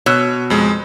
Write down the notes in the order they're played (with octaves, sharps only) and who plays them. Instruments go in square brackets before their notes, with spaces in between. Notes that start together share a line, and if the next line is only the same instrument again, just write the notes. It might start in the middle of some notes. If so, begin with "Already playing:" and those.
[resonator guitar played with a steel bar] B2 [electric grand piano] C#5 E6
[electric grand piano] F2 G#3